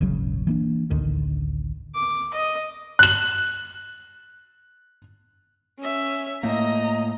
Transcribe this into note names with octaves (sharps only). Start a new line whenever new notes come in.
D#1 G#1 C#3 F#3
E3 A#3 D4
A1 D2 D3 D#3
D6
D#5
F#6 F#7
C#4 E5
A2 A3 A#3 D#5 A#5